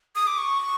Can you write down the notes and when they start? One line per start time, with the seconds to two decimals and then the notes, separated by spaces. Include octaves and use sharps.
0.15 D#6
0.27 D6
0.38 C#6